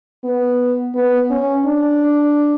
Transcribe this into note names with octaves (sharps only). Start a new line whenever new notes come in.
B3
B3
C#4
D4